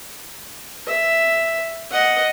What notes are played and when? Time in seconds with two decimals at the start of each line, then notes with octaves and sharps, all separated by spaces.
0.87 E5
1.92 D#5 F#5